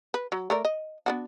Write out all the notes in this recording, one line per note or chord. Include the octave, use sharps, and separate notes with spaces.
B4
F#3
A3 A#4 D5
D#5
B3 D4 F#4